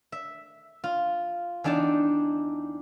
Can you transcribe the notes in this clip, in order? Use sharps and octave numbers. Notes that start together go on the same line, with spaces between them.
E5
F4
E2 D4 D#4 G5 A5